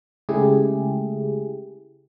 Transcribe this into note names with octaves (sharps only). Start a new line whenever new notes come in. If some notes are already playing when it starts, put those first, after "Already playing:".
C#3 G#3 A3 E4 G4 G#4